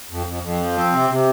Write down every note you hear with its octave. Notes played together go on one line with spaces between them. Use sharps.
F2
F2
F2
F3
C4
C3
C3